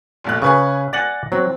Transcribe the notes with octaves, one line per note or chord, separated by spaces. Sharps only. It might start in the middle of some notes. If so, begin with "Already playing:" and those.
F1 A#1 F#6
C#3 G#4 B4 C#6
D5 F#5 G#5 A6 A#6 F#7
F#3 C4